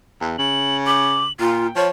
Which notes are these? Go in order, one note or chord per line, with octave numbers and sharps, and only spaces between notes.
E2
C#3 F#7
D6 F#7
A#2 F4 G5
F3 C#5